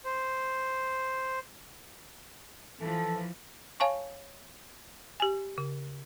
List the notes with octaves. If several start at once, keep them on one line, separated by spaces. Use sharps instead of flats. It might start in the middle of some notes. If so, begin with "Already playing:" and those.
C5
E3 F3 A4 A5
C#5 F5 G#5 A5 C#6
G4 G#5
C#3